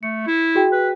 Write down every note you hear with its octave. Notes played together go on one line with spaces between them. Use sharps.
A3 C#7
E4
F#4 G#4 G5
B4